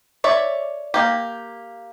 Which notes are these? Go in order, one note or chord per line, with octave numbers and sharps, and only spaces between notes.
C#5 D5 E5
A#3 G4